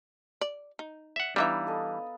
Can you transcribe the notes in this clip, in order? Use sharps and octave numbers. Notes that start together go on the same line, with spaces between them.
D5
D#4
D5 E5 F#5
E3 G3 B3 D4 D#4 E5 F5 A#5
A4 D#5